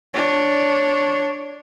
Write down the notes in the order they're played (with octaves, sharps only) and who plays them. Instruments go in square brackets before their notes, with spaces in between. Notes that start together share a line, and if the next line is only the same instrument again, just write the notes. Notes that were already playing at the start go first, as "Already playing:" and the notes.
[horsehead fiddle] D4 C#5